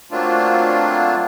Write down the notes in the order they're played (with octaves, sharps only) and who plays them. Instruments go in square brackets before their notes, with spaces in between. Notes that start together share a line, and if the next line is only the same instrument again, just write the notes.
[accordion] F#3 A3 A#3 C4 D4 F4